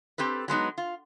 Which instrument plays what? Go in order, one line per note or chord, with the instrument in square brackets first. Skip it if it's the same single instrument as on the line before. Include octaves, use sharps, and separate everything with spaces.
[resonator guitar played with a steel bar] C4 G4 A4 B4
F#3 G#3 B3 D#4
F4